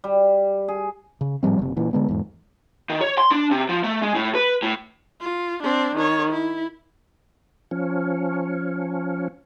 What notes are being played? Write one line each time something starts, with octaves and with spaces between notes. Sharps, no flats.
G3
G#4
C#3
A2 F3 G3 C4
F#1 C3
A#2 E3
D3 G#3 B3
E2 G#2
D#3
C#5
C6
D4
C3
F3
A3
G#3
A2
B4
A2
F4
C4 D4
D#3 C#5
E4
F3 C#4